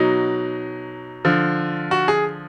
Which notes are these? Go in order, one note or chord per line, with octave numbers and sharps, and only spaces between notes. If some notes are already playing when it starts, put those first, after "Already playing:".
Already playing: B2 F#3 D#4
D3 F3
F#4
G#4